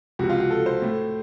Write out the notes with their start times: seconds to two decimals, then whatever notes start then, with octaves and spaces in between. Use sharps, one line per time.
0.19 C#2 C3 F3 F#4
0.30 F4
0.40 F#4
0.50 A4
0.66 C5
0.82 A2 A3